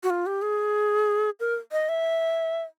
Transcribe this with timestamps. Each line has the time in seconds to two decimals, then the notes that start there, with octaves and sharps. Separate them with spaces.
0.03 F#4
0.10 F4
0.26 G4
0.42 G#4
1.40 A#4
1.72 D#5
1.89 E5